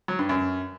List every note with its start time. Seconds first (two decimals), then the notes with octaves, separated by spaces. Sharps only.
0.08 F#3
0.19 G2
0.29 F#2